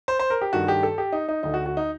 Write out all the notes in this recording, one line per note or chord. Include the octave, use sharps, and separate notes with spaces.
C5
C5
A#4
G4
G2 D#3 A3 F#4
G4
A4
G4
D#4
D#4
D2 D3 A3 D#4
F#4
F#4
D#4